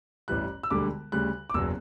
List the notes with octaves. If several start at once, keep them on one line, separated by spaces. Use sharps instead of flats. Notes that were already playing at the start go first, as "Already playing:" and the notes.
A1 G2 E3 G3 F#6
E6
E1 D2 D3 G3 D6
D2 C#3 G3 F#6
D6
F#1 E2 B2 F#3 E6